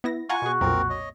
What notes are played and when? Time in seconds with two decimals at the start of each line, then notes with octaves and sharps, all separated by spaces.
0.04 B3 E4 A#6
0.29 F4 F#5 G#5 A#5 C#6
0.42 B2 F#4 G#4
0.61 B1 F2 A#2 C4 A#4
0.90 C#5 D#5